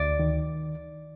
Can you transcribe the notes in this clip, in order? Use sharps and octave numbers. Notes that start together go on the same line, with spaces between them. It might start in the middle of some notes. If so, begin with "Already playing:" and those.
Already playing: D2 D5
D#3